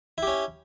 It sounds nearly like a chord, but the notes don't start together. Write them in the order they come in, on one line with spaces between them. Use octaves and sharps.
E4 G4 C#4